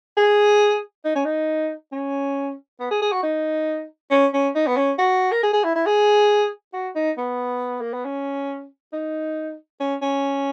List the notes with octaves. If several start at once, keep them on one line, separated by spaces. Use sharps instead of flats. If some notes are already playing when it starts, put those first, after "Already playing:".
G#4
D#4
C#4
D#4
C#4
B3
G#4
G#4
F#4
D#4
C#4
C#4
D#4
B3
C#4
F#4
A#4
G#4
G#4
E4
E4
G#4
F#4
D#4
B3
A#3
B3
C#4
D#4
C#4
C#4